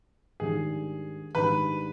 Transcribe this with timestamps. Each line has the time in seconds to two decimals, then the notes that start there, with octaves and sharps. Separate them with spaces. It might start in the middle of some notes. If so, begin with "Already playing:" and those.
0.40 G#2 D#3 G3 D4 G#4
1.34 G#2 D#3 G3 D4 B4